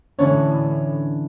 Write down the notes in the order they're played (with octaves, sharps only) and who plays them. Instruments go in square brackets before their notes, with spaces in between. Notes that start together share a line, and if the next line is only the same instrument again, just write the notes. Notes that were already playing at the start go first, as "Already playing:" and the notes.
[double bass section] A2 [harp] D3 E3 [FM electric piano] C#4 D4 [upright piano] C#5